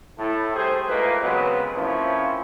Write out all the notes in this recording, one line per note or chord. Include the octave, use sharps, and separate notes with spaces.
A2 E4 A4
C2 A3 G4 G#4 C5
G#2 F3 A3 A#3 D#4 B4
C#3 F#3 G#3 B3 C4 B4
F3 A#3 C4 C#4 E4 F4